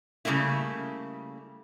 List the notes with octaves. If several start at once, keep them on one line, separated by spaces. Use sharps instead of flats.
C#3 G3 A3 A#3 E4